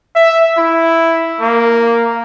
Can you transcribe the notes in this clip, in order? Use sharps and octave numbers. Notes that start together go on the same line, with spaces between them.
E5
E4
A#3